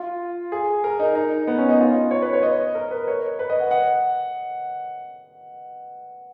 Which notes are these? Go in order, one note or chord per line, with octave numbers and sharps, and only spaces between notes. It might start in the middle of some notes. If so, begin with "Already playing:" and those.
Already playing: F4
G#4
A#4
D#4
D#4
B3
C#4
D#4
F4
C#5
B4
C#5
D#5
A#4
B4
C#5
B4
D#5
F#5
F#5